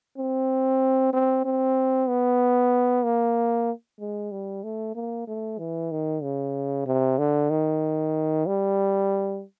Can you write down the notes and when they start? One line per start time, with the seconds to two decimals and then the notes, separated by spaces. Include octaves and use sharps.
0.18 C4
1.13 C4
1.45 C4
2.08 B3
3.04 A#3
4.00 G#3
4.31 G3
4.63 A3
4.95 A#3
5.27 A3
5.58 E3
5.91 D#3
6.23 C#3
6.86 C3
7.18 D3
7.50 D#3
8.46 G3